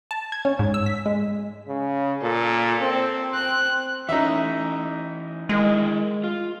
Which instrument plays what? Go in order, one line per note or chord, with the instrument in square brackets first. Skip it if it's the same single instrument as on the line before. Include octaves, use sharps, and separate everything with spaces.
[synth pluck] A5
G#6
C#4
G#2
E6
B6
G#3
[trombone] C#3
[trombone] A#2 [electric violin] A4
[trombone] C4
[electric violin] F#6
[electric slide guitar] E3 C#4 [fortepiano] D#4 E5
[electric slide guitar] D#3 E4 A#4 [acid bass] G#3
[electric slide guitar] F4